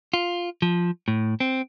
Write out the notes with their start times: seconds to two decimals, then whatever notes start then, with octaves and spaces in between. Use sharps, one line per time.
0.14 F4
0.62 F3
1.08 A2
1.40 C4